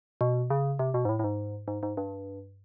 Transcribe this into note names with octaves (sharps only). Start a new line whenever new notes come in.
B2
C#3
C3
B2
G#2
A2
A2
G#2
G#2
G#2
G2